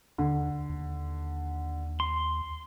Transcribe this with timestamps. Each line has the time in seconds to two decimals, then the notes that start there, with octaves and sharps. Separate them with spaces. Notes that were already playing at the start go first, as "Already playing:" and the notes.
0.18 D#2 D3
0.69 D#2
2.00 C6